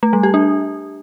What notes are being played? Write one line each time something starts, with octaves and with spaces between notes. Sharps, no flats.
A3
G3
G4
D4